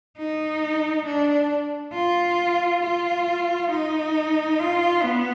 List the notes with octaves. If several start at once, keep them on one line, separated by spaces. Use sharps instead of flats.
D#4
D4
F4
F4
D#4
F4
B3